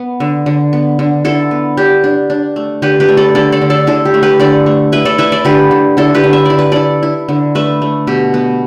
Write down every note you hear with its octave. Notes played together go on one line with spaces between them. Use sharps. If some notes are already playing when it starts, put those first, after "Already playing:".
Already playing: B3
D3
D3
B3
D3
D3 E4 A4
B3
D4 G4
D4
D4
A3
D3 G4 B4
G4 B4
A3
A4 D5
D3 A4 D5
A4 D5
D3
A4 D5
D3 E4 A4
G4
A3
G4 B4
D3 A4 D5
A3
E4 B4 E5
A4 D5
E4 B4 E5
A4 D5
D3 G4 B4
D3
D3 E4 A4
G4 B4
D3
E5
E4 D5
B4
E4 A4 D5
E4
D3
A3 B4 E5
A3
B2 G4
B3